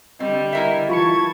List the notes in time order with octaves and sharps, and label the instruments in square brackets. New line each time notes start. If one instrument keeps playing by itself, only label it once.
[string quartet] D3 G3 [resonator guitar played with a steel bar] C4 [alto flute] D#5
[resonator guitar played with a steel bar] E4 A#4 E5
[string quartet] E3 A5 G#6 [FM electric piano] F4 B5 C#7 [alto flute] C#6